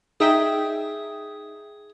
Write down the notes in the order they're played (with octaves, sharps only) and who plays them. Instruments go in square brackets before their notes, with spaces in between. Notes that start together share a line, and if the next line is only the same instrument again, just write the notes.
[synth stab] D#4 E5 G5 [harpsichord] G#4